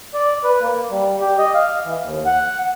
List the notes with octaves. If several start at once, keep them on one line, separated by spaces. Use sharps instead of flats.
D5
B4
A#3
G3
G4
D#5
F5
E3
D#2
F#5